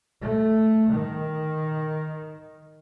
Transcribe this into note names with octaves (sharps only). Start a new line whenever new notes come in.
A3
D#3